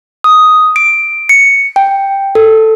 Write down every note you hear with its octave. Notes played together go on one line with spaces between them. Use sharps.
D#6
D7
C#7
G5
A4